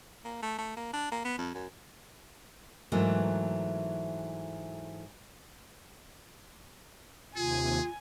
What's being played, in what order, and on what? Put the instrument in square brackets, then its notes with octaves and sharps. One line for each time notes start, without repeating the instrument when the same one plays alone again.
[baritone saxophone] A#3
A3
A3
A#3
D4
A#3
B3
F2
F#2
[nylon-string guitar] G#2 E3 F#3 A3 A#3
[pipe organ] D#2 C3 [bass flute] F4 [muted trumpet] G#4 [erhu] G#5